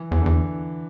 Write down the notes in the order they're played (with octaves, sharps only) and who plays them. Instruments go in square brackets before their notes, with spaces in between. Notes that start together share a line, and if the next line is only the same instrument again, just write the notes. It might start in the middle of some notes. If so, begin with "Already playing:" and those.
Already playing: [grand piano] E3
[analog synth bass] E2 [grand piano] E3
[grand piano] D3
[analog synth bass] E2